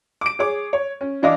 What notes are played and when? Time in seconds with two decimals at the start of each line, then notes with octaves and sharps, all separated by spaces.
0.21 D6 D7
0.39 G#4 C#5 D6
0.73 C#5
1.01 C#4
1.22 E3 D4 E4 D#5 F5 D6